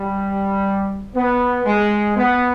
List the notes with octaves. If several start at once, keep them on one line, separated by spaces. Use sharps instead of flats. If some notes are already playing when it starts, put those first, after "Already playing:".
Already playing: G3
B3
G#3
B3